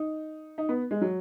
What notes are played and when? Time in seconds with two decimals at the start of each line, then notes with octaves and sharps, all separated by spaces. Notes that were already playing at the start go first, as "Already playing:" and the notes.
Already playing: D#4
0.58 D#4
0.69 B3
0.91 G#3
1.01 F#3